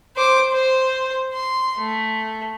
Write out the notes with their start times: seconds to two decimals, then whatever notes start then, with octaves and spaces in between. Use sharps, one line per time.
0.16 C5 D6
0.53 C5
1.34 C6
1.77 A3